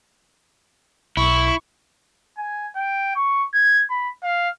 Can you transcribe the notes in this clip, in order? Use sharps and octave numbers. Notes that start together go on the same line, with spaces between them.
B1 E4 C#6
G#5
G5
C#6
G#6
B5
F5